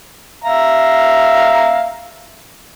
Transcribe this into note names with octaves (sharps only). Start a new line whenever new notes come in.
E5 F5 A#5